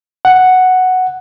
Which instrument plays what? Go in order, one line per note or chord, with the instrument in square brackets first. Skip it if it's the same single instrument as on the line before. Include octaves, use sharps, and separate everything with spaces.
[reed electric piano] F#5